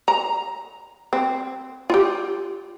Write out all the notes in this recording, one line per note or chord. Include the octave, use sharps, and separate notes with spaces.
A#5
C4
F4 G4